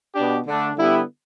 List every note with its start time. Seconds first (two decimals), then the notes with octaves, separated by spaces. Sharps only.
0.14 B2 B3 D4 G4
0.46 D3 A3 D4
0.76 D3 G3 B3 E4 G4